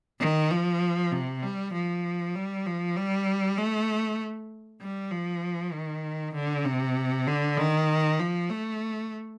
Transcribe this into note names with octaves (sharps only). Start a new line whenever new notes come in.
D#3
F3
C3
G3
F3
G3
F3
G3
A3
G3
F3
D#3
D3
C3
D3
D#3
F3
A3